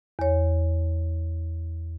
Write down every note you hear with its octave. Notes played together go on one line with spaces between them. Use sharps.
E2 C#5